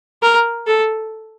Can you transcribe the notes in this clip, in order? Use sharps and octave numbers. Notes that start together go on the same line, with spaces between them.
A#4
A4